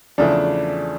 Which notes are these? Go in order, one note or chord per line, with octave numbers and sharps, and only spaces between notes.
E2 C#3 F3 A3 D4